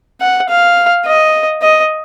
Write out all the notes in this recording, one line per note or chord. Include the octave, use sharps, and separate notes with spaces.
F#5
F5
D#5
D#5